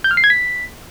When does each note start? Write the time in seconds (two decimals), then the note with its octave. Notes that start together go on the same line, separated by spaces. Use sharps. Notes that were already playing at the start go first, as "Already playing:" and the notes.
0.04 G6
0.11 F6
0.17 C7
0.24 G#6
0.30 B6